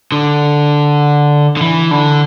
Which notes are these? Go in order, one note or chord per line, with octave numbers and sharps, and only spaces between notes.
D3
D3
E3
D3